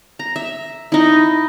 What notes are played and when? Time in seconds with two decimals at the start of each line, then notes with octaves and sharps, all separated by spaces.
0.19 A#5
0.36 E5
0.92 D#4 E4